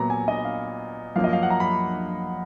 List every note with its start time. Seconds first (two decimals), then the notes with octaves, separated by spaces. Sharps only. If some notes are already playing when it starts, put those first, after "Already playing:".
Already playing: A#2 F#3 B3 A#5
0.10 G#5
0.28 D#5
0.45 F5
1.16 F#2 F3 A#3 F5
1.24 D#5
1.33 F5
1.43 F#5
1.50 A#5
1.60 B5